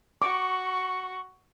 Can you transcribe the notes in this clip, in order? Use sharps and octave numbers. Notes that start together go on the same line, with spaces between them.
F#4 C#6 D6